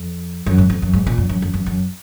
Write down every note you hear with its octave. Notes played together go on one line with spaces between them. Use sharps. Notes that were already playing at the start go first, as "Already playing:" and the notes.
Already playing: F2
F#2
G#2
F2
F#2
G#2
A#2
F#2
F#2
F#2
F#2
F#2